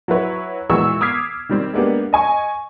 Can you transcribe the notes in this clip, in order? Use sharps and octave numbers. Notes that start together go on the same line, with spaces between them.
F#3 E4 F#4 B4 C#5
A#2 E3 G#3 F#4 C#6 E6
D6 D#6 F6 G#6 B6 C7
D#3 G3 C4
G#3 A#3 B3 D4 G4
D#5 G#5 C#6